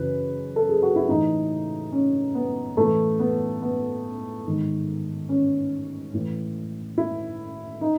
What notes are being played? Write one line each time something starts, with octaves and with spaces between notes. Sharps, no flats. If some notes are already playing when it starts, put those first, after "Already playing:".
Already playing: F#2 C#3 E3 B4
A4
G#4
F#4
E4
A2 E3 D#4
C#4
B3
A2 E3 A3
B3
B3
G#2 D#3
C#4
A2 E3
E4
D#4